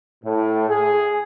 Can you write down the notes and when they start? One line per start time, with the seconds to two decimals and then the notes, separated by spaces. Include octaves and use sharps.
0.25 A2
0.69 G#4